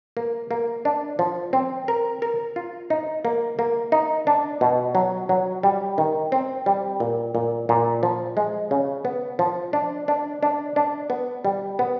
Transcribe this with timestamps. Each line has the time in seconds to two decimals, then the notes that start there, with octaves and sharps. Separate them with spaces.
0.17 A#3
0.51 A#3
0.85 D4
1.19 F3
1.53 C4
1.88 A#4
2.22 A#4
2.56 F4
2.90 D#4
3.25 A#3
3.59 A#3
3.92 D#4
4.27 D4
4.61 B2
4.95 F#3
5.29 F#3
5.63 G3
5.98 D#3
6.32 C4
6.66 G3
7.00 A#2
7.35 A#2
7.69 A#2
8.03 F3
8.37 G#3
8.71 C#3
9.05 B3
9.39 F3
9.73 D4
10.08 D4
10.43 D4
10.76 D4
11.10 B3
11.45 G3
11.79 B3